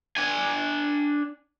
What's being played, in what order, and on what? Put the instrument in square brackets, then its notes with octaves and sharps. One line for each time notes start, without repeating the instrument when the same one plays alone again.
[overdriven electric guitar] D4 G#5